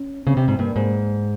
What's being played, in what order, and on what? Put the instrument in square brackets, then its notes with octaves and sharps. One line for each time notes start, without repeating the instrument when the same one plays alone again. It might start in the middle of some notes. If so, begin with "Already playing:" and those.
Already playing: [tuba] C#4
[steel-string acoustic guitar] C#3 [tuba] C4
[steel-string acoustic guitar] C3
G#2
[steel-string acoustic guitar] G2 [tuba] A#3
[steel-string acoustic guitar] G#2